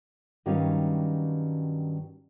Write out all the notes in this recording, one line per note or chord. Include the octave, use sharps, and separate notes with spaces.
G2 D#3 F#3 G3 C#4 F5